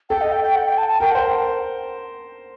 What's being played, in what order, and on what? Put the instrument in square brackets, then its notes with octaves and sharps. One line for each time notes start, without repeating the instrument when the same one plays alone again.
[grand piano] A4 [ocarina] G5
[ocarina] D#5
G5
G5
F#5
G5
A5
A5
[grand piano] A#4 [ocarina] G5
[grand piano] C5 [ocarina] F#5